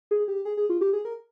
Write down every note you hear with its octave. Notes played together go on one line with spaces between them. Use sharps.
G#4
G4
G#4
G#4
F4
G4
G#4
A#4